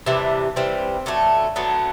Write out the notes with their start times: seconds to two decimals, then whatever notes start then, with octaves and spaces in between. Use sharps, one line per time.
0.06 C3 E3 G3 D4
0.56 C3 E3 G3 C4
1.06 D3 F#3 A3
1.56 D3 F#3 A3 B3